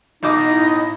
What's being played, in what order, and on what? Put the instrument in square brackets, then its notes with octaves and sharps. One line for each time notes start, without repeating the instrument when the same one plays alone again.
[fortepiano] B1 B2 D6 [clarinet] D#4 [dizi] D#5
[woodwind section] A2 E4